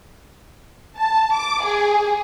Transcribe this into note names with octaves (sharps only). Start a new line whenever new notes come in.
A5
D6
G#4